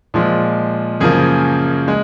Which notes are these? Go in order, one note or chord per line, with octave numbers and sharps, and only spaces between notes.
A#2 F3 G#3
F#2 C#3 F3 A#3 G#4
G#3